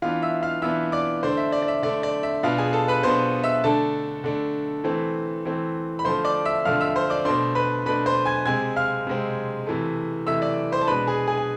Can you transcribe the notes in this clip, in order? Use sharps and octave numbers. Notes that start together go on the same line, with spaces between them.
E3 B3 D4 F4 F5
E5 E6
F5 F6
E3 B3 D4 E5 E6
D5 D6
D3 A3 D4 C5 C6
E5
D5
D5
E5
D3 A3 D4 D5
D5
E5
B2 B3 D4 F4 F5
G#4 G#5
A4 A5
B4 B5
B2 B3 D4 C5 C6
E5 E6
D3 A3 D4 A4 A5
D3 A3 D4
E3 A3 C4
E3 A3 C4
B5
D3 F3 A3 C5 C6
D5 D6
E5 E6
D3 F3 A3 F5 F6
E5 E6
C5 C6
D5 D6
B2 A3 D4 C5 C6
B4 B5
B2 A3 D4 B4 B5
C5 C6
G#5 G#6
C3 G#3 C4 G#5 G#6
F5 F6
C3 G#3 C4
C3 E3 A3
C3 E3 A3 E5 E6
D5 D6
C5 C6
A5
B2 G#3 D4 B4 B5
G#4 G#5
G#4 G#5
G#5